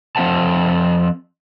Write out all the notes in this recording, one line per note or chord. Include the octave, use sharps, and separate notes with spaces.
F3 C4 E5 F#5 A5